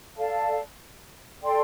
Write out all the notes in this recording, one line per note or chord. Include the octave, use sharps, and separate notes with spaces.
A4 D5 F5 A5
A4 D5 G5 C6